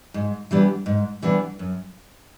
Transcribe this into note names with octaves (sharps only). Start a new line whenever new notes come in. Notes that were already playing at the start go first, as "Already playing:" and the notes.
G#2
E3 G3 B3 D4
G#2
E3 G3 B3 D4
F#2